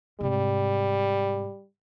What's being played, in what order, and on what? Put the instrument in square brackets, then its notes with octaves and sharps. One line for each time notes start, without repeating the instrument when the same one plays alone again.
[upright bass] G#2 C3 [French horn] G3